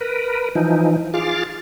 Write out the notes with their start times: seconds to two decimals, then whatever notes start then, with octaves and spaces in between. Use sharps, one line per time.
0.01 A#4 B4
0.55 E3 F3 D#4
1.14 F4 G#4 D6 F6 A6